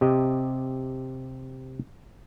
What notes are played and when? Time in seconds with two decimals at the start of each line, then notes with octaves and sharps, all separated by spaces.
0.01 C3 G4 D#5